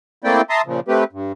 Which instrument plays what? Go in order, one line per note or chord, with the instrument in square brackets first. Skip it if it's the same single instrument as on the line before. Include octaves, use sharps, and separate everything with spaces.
[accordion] A3 A#3 C4 E4 D5 G5
E5 A5 A#5 C6 D#6
A#2 C#3 F3
A3 C4 G4 B4
G2